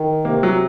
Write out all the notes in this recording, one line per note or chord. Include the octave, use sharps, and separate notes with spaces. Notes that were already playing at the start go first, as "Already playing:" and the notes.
Already playing: D#3
C3 A#3
F#3